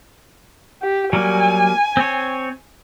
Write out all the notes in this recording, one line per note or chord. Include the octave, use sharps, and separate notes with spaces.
G4
F#3 G3 A#3 G#5
C4 C#5